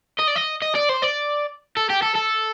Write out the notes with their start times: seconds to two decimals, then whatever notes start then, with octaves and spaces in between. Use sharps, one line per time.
0.19 D#5
0.27 D5
0.35 D#5
0.62 D#5
0.75 D5
0.89 C5
1.02 D5
1.77 A4
1.90 G4
2.02 A4
2.15 A4